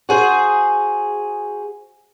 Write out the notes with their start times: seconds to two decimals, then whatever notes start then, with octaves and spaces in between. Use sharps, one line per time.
0.09 F#4 G#4 C5